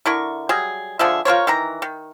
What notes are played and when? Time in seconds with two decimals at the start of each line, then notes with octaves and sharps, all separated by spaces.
0.06 D3 E4 A#4 C#6
0.49 F#3 G3 G#4
0.99 D3 F3 G#4 E5
1.25 F4 A#4 C5 C#5
1.47 D#3 E3 A#5
1.82 D#3